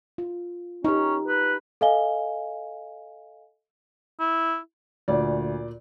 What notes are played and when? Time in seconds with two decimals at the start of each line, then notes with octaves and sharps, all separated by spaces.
0.18 F4
0.85 C#4 D#4 G4
1.28 B4
1.81 A4 D#5 F5 G#5 G7
4.20 E4
5.08 D2 A#2 D5